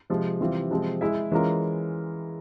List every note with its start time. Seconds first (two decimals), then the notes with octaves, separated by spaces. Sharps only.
0.10 C3 F3 G#3
0.40 C3 E3 G3 C4 F4
0.71 C3 F3 G#3 C4
1.01 G#3 E4 G#4 E5
1.32 E3 G#3 C#4 F4 A#4